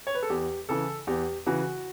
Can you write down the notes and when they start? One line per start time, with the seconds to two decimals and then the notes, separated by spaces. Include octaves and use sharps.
0.07 C#5
0.15 B4
0.23 A4
0.30 E2 G4
0.69 C#3 E3 A4
1.07 E2 G4
1.46 C#3 E3 F#4